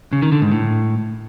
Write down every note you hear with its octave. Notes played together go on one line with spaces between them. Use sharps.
C#3
D#3
D3
G#2
A2